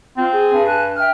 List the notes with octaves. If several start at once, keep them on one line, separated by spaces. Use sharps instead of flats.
C4 F4
G#4
G2
G#5 A5 F#6
E5 G5 F6